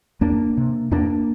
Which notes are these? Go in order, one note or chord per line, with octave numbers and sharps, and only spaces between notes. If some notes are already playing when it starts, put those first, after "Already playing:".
E2 A#3 D4
C3
E2 A#3 D4